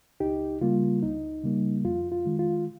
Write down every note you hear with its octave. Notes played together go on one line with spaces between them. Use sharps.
C#2 D#4 G4
C#3 G3 A#3 F4
C#2 D#4
C#3 G3 A#3
F2 F4
F4
D#3 G#3
F4